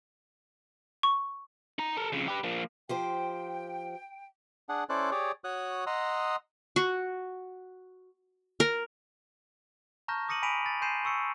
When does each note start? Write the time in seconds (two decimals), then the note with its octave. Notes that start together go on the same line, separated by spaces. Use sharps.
1.03 C#6
1.79 D#4 A#5
1.97 A4 A#4
2.12 F2 C#3
2.28 G4 B4
2.44 F3 A#3
2.89 F3 G4 C5 G5
4.69 D4 G#4 F#5
4.89 C#4 E4 A4 C5 D5 F#6
5.11 G4 G#4 C#5 D5
5.44 F#4 C#5 D#6 F#6
5.87 D#5 F#5 A#5 C6 D#6 E6
6.76 F#4
8.60 A#4
10.08 A5 A#5 C#6 F6 G6 A#6
10.28 D6 D#6 A#6 C#7 D#7 F#7
10.43 G#5 B5 B6 D7 D#7 F7
10.66 A6
10.82 G#5 C6 G6 C7 D#7 E7
11.04 C6 C#6 E6 C#7